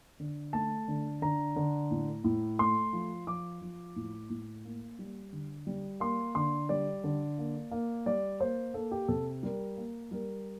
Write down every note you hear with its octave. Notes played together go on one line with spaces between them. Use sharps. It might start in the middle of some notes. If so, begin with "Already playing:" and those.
D3
A3 A5
D3
D3 A#5
D3
A2
A2
A3 C6
F3
F3 D6
F3
A2
A2
A#3
G3
D3
G3
A#3 C6
D3 C6
G3 D5
D3
A#3
A#3
G3 D5
A#3 C5
A#3 A4
G4
C3 A4
G3 A#4
A#3
G3 A#4